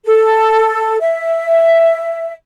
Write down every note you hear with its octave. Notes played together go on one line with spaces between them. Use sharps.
A4
E5